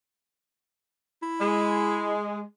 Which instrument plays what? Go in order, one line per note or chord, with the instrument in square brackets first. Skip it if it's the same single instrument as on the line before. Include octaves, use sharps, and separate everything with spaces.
[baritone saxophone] E4
[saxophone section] G#3